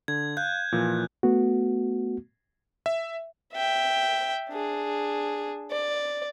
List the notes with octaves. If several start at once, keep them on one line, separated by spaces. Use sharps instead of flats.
D3 G#6
F5 F#6 G6
A#2 E3 F3
A3 B3 F#4
E5
E5 G5
D4 G#4
D5